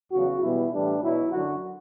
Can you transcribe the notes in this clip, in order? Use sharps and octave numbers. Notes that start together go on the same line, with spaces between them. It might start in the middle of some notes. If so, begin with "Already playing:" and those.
E2 C#3 F#3 F#4
E2 B2 G3 E4
A2 E3 G3 D4
B2 F#3 E4
F#2 D3 F#3 F#4